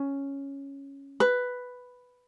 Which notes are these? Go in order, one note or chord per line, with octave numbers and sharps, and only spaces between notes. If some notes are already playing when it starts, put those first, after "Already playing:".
Already playing: C#4
B4